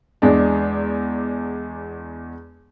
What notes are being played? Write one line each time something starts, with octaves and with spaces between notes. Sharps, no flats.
E2 G#3 D4